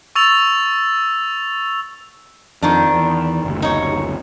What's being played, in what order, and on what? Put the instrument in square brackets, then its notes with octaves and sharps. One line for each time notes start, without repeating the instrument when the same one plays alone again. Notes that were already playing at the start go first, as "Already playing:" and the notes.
[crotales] C#6 E6 A6 F7
[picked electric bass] F2 [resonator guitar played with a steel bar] D#3 D4
[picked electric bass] E2
F#1 D2
[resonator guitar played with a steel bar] D#4 C#5